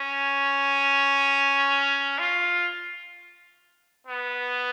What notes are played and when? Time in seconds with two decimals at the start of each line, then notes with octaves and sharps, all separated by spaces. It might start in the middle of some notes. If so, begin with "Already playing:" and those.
Already playing: C#4
2.19 F4
4.07 B3